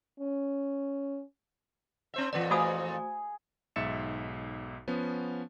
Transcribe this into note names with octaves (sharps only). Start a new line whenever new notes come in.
C#4
C4 C5 E5
F2 A#2 E3 F4 B4 D5
A3 F#4 G#4 C5 F5 B5 D#6
B1 G#2 E5 A6 C#7 E7
F3 B3 C#4